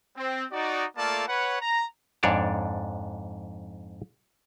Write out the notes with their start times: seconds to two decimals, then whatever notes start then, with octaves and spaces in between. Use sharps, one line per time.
0.17 C4
0.52 D#4 F#4 D5
0.97 A3 A#3 F4 A4 D5 A5
1.28 B4 C#5 F#5
1.61 A#5
2.23 F2 G#2 D4 C#5 D5 A5